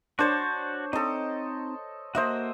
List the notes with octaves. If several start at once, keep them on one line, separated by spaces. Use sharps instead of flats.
D4 F#4 C5 C#5 A5
C4 D#4 A4 D#5
A#3 F#4 C5 D#5 E5